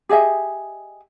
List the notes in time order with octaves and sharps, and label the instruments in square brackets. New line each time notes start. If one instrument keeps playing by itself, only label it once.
[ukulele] G4 G#4 D#5 E5